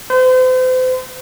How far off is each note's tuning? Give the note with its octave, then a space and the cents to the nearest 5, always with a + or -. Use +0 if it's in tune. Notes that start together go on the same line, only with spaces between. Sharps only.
C5 -40